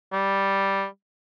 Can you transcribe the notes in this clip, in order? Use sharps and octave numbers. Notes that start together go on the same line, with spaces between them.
G3